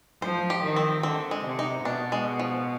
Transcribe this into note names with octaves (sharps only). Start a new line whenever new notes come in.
F3 C5
G4
D#3
C4
D3 C4
G#3
C3
D#4
B2 D4
G#3
F3